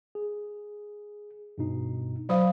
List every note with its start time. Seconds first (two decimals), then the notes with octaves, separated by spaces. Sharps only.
0.15 G#4
1.58 G2 B2 D#4
2.29 F#3 C5 D5 F5 B5 D#6